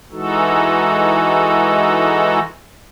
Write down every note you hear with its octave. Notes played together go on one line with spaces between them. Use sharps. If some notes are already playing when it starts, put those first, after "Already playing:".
E3 G#3 D#4 F#4 A4